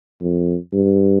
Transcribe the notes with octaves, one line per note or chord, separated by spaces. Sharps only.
F2
G2